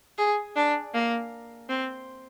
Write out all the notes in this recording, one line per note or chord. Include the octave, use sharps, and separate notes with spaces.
G#4
D4
A#3
C4